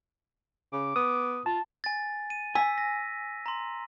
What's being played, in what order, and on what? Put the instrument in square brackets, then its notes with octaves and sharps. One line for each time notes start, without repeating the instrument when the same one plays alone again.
[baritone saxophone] C#3 [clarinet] D6
[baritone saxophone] B3 [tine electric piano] D#6
[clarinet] F4 [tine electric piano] A5
[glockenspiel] G#5 A6
D#7
[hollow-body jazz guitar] G#5 [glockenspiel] E6 B6
[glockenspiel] A#6
A#5 C6